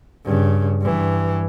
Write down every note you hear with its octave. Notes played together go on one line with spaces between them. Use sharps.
G2 C#3
G2 E3